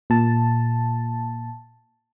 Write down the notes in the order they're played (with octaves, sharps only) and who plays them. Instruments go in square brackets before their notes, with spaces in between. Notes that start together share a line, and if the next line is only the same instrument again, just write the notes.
[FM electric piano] A#2 A5